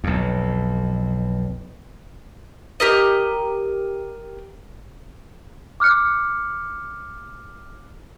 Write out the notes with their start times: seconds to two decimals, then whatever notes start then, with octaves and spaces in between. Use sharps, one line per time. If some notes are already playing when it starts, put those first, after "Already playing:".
0.04 B1 F2
2.80 G4 A#4 D#5
5.80 D6 F6 F#6 C#7